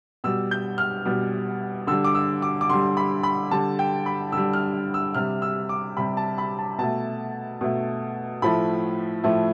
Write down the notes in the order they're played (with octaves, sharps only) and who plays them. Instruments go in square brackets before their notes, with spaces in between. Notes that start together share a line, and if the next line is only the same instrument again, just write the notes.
[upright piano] B2 G3 E6
G6
F6
B2 G3
D3 G3 E6
D6
E6
D6
D6
D3 G3 C6
B5
B5
D3 G3 A5
G5
B5
D3 G3 E6
F6
E6
C3 G3 F6
E6
D6
C3 G3 B5
A5
B5
A5
B2 A3 A5
B2 A3
A2 F3 A3 B5
A2 F3 A3